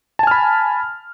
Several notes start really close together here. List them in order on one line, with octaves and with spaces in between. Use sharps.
A5 G#5 F6 B5